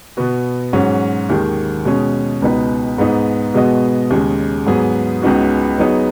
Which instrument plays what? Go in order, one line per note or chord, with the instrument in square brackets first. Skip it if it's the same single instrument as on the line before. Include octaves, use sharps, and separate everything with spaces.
[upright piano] B2 B3 F#4
G#2 F#3 C#4 F#4
D#2 D#3 G#3
B2 G#3 C#4 G#4
C#2 B2 B3 D#4 B4
G#2 G#3 B3 D#4
B2 G#3 B3 F#4 D#5
D#2 C#3 G#3
G#2 F#3 B3 G#4
C#2 C#3 B3 D#4 F#4
F#3 B3 D#4 G#4 C#5